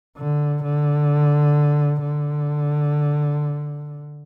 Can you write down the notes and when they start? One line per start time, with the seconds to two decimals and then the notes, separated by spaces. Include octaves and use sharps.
0.17 D3
0.63 D3
2.02 D3